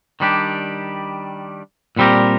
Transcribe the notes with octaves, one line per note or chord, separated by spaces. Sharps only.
D#3 G3 D4 G4
A#2 G3 C4 G4 A#4